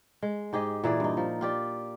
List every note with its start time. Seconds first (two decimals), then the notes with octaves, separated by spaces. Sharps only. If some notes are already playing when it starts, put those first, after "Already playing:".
0.22 G#3
0.53 G#2 G4 G#4 D#5
0.84 A#2 E3 G#4 D5
1.00 G2 D#4
1.17 F3
1.41 F4 G4 D5